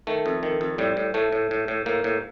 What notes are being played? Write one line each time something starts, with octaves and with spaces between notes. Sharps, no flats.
D#3 A3
F2
D#3
F2
A2 G3
A2
A2 A3
A2
A2
A2
A2 A#3
A2